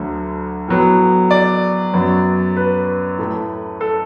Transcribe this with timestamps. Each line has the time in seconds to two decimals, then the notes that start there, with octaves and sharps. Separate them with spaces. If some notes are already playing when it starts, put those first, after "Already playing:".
Already playing: D2 D3 F#3 A3
0.68 A2 F#3 B3
1.31 D5
1.93 F#2 F#3 B3
2.57 B4
3.19 A2 A3
3.81 A4